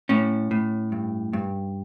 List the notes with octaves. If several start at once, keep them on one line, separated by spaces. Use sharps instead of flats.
A2 C#4
A2
G2
G2